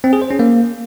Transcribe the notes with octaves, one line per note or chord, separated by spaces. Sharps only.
C4
G#4
C5
C#4
A#3